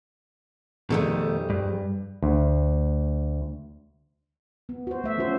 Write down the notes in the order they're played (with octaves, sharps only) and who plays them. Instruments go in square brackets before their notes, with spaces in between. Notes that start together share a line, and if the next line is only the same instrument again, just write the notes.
[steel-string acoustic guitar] F2 G3 G#4 [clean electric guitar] B2 D#3 A3
[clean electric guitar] G2
[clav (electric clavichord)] D2
[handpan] B3
F#4 C5
A3 E5
F3 C#4 F4 F#4 C5